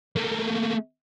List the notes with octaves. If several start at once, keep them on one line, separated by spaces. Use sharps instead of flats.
A3 A#3